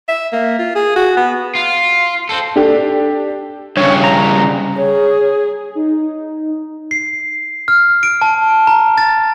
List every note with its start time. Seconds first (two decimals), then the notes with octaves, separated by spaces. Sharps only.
0.08 E5
0.32 A#3
0.59 F4
0.75 G#4
0.96 F#4
1.17 B3
1.55 F4
2.29 A4 C5
2.56 D4 G4 A4
3.77 G2 C#3 C#5
4.04 A#5
4.77 G#4 C#5
5.75 D#4
6.91 C7
7.68 F6
8.03 D7
8.22 A5
8.67 A#5
8.98 A6